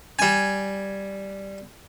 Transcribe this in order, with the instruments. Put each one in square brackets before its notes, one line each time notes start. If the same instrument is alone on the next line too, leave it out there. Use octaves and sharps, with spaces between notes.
[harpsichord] G3 G#5